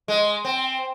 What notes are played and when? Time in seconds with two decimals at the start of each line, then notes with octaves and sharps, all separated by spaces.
0.08 G#3
0.45 C4